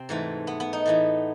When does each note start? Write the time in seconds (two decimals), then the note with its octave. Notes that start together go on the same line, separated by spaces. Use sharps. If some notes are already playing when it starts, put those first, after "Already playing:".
Already playing: C3 C4
0.09 G#2 E3 A3
0.47 B3
0.60 B3
0.73 D#4
0.86 A2 E3 A3